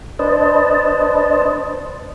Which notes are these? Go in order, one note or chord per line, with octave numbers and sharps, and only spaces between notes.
D4 B4 C5 D#5 A5